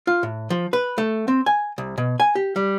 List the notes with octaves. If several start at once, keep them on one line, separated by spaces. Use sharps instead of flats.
F4
A2
F3
B4
A3
C4
G#5
C2
B2
G#5
G4
G3